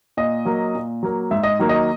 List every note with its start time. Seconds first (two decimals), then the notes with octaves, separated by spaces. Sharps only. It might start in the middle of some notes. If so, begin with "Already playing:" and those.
0.17 A#2 D#5
0.45 F#3 A#3
0.75 A#2
1.03 F#3 A#3
1.31 G#2 E5
1.43 D#5
1.59 D#3 F#3 A#3
1.69 D#5